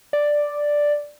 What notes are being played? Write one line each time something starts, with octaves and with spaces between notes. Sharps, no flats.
D5